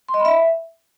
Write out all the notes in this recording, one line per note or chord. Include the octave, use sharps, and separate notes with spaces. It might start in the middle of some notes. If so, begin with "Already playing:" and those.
C6
D#5
B5
E5